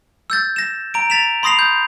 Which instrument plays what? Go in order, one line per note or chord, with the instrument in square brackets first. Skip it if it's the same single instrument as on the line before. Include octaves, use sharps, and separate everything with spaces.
[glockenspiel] E6 G6 A6
A#6 E7
A#5 D7
A6 B6 E7 F7
B5 C6 D#6 A#6 C7 F7
G6